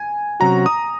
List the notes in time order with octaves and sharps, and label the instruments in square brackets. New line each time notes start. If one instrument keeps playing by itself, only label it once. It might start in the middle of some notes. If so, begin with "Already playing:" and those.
Already playing: [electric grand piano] G#5
[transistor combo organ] C3 F#3 C#4 F#4 [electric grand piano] A#5
[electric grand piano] D#6